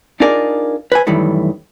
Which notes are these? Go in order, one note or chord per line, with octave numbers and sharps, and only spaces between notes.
D4 D#4 F4 G#4 A#4 D5
B4 C5 G#5
F#2 D#3 E3 G3 A3